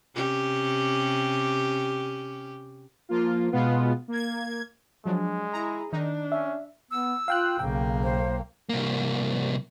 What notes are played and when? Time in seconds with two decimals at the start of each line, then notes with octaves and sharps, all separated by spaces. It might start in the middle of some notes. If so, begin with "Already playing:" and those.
0.15 C3 C#4 G4
3.09 F3 A#3 F4
3.51 B2 G#3 B3 F4
4.08 A#3 G#6
5.06 F3 F#3 G#3 D4
5.53 E4 G#4 A#5
5.92 D#3 D4 D#4
6.32 C#4 E5
6.91 B3 E6
7.28 F4 F5 G5 F#6
7.59 B1 C#3 A#3 G5
8.03 C5
8.69 C2 A#3